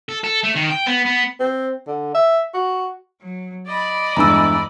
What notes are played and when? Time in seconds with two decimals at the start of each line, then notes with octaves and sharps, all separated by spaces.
0.09 A4
0.24 A4
0.43 A3
0.55 D#3
0.70 G5
0.86 B3
1.05 B3
1.40 C4
1.87 D3
2.15 E5
2.54 F#4
3.20 F#3
3.68 D5 D#5 B5
4.17 E2 G2 G#3 A#5 E6